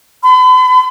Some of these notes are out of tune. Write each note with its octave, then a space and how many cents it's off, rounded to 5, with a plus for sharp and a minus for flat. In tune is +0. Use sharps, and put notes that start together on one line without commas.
B5 +40